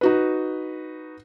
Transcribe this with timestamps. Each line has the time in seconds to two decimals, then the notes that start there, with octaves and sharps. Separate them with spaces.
0.01 D#4 F#4 B4